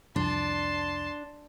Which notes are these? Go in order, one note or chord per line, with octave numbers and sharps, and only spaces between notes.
C2 F2 D4 A5 C6